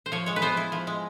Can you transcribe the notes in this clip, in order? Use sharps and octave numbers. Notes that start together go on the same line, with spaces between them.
C5
F3 C#5
G#3 C#5
B4
B3 C5
E4
F3
G#3